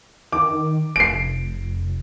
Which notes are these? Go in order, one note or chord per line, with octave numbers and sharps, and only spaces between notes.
D#3 D6
F1 C7 D7